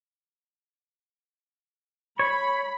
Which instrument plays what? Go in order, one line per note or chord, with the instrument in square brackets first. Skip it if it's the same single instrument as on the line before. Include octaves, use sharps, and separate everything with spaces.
[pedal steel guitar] C#5 [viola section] B5